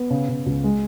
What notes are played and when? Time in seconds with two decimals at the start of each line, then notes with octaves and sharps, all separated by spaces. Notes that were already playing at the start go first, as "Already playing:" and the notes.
Already playing: B3
0.10 C#3
0.29 C#3
0.46 C#2
0.64 G#3